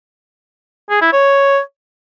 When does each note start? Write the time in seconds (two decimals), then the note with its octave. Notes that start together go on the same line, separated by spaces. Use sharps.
0.90 G#4
1.02 E4
1.13 C#5